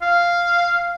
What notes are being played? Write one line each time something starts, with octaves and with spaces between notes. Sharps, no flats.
F5